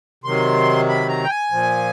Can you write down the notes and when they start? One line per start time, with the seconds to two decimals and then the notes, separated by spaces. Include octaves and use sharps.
0.24 C3 D#3 F#3 C6
0.88 B5
1.09 A#5
1.24 G5
1.30 G#5
1.51 A#2 F3